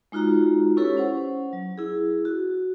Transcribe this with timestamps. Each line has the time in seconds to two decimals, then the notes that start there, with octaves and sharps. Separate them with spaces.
0.12 G#3 D#4 F4 F#4 A#5
0.77 C#4 E4 G4 A4 B4 C#5
0.97 C#4 C5 F#5
1.53 F#3
1.78 E4 G#4
2.25 F#4